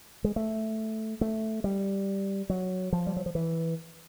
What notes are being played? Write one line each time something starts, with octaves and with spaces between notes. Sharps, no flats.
G#3
A3
A3
G3
F#3
F3
G3
F#3
F3
E3